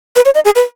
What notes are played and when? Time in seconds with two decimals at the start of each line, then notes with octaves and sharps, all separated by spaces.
0.16 B4
0.25 C#5
0.35 D#5
0.45 G#4
0.56 B4